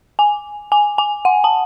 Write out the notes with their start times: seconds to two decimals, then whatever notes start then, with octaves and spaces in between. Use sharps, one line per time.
0.19 G#5
0.72 G#5
0.98 G#5
1.25 F#5
1.44 A5